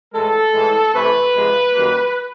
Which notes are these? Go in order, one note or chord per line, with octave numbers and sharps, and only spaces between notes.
A2 E3 G#3 A4
A2 E3 G#3
C3 E3 A3 B4
C3 F3 G#3
F#2 D#3 G3 A#3